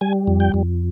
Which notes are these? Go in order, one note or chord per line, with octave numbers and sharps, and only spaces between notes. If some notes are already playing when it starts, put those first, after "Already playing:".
G3 G#5
F2
G5
F2